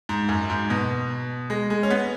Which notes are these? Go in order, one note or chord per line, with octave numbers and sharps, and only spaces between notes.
G#2
F#2
G#2
B2
G#3
G#3
C#4
B3